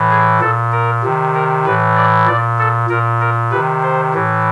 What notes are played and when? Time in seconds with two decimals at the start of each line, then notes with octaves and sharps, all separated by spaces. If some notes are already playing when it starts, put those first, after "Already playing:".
Already playing: A2 E3
0.11 G#4
0.41 A#2 A4
0.72 A#4
1.03 C3 D#3
1.35 A#4
1.65 A2 E3 B4
1.96 D5
2.27 A#2 D5
2.59 A4
2.90 A#2 A#4
3.21 A#4
3.51 C3 D#3 B4
3.82 C5
4.14 A2 E3